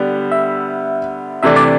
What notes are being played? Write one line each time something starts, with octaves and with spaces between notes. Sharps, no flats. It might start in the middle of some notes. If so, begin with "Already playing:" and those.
Already playing: D3 G3 B3 D5
E5
C3 E3 A3 D4 E5
D5